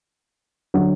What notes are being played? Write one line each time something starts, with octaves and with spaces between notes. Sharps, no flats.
D3 F#3